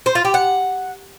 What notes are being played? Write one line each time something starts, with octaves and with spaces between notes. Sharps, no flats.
C5
F4
G4
F#5